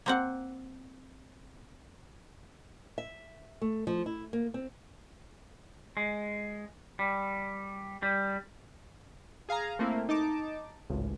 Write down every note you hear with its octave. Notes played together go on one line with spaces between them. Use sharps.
A#3 C4 F#5
E5
A3
F3
E4
A#3
C4
G#3
G3
G3
G#4 F5 G#5 A#5
A3 A#3 C4 E4
D#4 A5 D6
G#1 C#2 A2